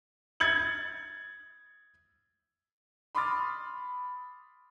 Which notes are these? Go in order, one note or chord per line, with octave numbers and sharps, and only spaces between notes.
G#6 A6 C#7 F#7
B5 C6 D6 D#6 F6 A6